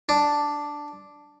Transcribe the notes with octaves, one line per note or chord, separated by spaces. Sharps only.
D4